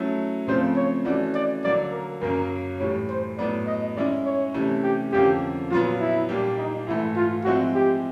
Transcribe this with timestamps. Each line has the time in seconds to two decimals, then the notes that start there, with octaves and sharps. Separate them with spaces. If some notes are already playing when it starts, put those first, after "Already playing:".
Already playing: F#3 A3 C#4 E4
0.47 C#3 F3 A3 C4 C5
0.76 C#5
1.05 E3 A3 C#4 F#4 D5
1.35 D5
1.64 D3 F#3 A#3 D5
1.92 A#4
2.21 F#2 C#3 F#3 A#3 C#4 A#4
2.80 A2 E3 G3 C#5
3.10 C5
3.38 A2 F#3 B3 D5
3.67 D#5
3.96 D#3 G#3 C#4 E4 D5
4.26 C#5
4.54 C3 E3 A3 C#4 E4
4.83 G4
5.12 F2 D3 F3 A#3 C#4 G4
5.70 A#2 F#3 B3 F4
6.00 E4
6.29 A#2 G3 A#3 D4 G4
6.58 D#4
6.87 G#2 E3 A3 E4
7.16 F4
7.45 F3 G#3 C4 E4 F#4
7.75 G4